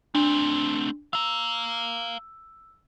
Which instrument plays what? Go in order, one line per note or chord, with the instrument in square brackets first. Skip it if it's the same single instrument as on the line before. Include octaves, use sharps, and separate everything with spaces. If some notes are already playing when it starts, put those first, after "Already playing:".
[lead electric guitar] A3 C4 [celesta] D4
[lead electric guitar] F5 A#5 [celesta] E6